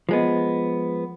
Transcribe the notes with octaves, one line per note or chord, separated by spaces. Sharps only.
F3 G#3 B3